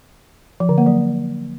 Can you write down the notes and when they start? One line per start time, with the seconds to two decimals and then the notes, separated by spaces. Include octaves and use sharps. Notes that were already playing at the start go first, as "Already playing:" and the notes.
0.60 F3
0.69 D3
0.78 A#3
0.86 F#3